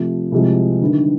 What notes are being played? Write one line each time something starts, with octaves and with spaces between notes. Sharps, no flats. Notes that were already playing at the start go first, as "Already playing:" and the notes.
Already playing: C3 F3 A3
C2 C3 F3 G#3 C4
G1 G2 D#3